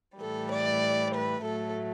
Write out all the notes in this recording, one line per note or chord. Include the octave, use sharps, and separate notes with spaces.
A2 E3 G3 A4
D5
B4
A2 F#3 A3 A4